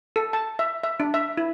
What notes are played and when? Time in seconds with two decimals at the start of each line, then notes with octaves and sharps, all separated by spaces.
0.16 A4
0.33 A5
0.59 E5
0.84 E5
1.00 D4
1.14 E5
1.37 E4